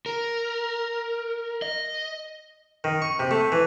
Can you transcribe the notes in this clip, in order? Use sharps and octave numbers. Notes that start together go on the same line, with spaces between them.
A#4
D#5
D#3
C#6
C3
A3
E3